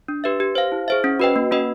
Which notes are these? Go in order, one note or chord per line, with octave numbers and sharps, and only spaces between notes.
D4
G4 B4 E5
G4
C5 F5
E4
G#4 C5 E5
C#4
F#4 B4 D#5 G5
A#3
C#4 F#4 B4 D#5